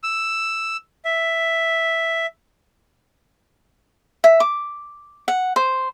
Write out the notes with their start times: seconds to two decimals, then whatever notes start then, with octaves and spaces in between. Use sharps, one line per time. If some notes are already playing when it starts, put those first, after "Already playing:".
0.03 E6
1.05 E5
4.24 E5
4.40 D6
5.28 F#5
5.56 C5